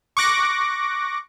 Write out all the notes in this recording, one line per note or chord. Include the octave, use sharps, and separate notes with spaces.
C#6 D6 F#6 A#6